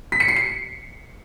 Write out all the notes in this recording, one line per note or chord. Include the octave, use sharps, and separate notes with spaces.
B6
C#7
C7
C#7